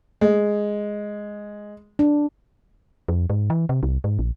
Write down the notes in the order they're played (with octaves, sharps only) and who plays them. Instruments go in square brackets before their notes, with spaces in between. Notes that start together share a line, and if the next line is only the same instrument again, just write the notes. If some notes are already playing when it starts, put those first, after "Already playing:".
[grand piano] G#3
[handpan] D4
[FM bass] F2
G#2
E3
C3
C2
G#2
A#1